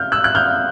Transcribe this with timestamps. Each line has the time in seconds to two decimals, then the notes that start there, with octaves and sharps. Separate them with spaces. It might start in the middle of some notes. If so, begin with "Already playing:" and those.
Already playing: F6 G6
0.12 E6 F#6
0.24 F#6
0.35 F6 G6